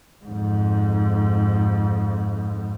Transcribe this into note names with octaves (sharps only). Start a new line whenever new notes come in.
F2 G#2